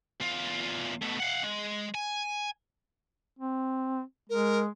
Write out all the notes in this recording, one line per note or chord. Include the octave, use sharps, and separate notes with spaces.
E2 F4
B2 A3
F5 F#5
G#3
G#5
C4
G#3 A#4